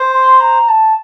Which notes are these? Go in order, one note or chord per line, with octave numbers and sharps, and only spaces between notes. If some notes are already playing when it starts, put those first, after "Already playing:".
Already playing: C5
C6
A#5
A5